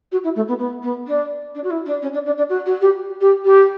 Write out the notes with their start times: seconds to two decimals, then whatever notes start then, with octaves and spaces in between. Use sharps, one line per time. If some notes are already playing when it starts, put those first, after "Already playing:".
0.12 F#4
0.24 E4
0.36 A3
0.48 B3
0.59 B3
0.83 B3
1.07 D4
1.55 D4
1.64 F#4
1.70 E4
1.86 D4
2.02 C#4
2.13 D4
2.26 D4
2.38 D4
2.49 F#4
2.66 F#4
2.81 G4
3.21 G4
3.45 G4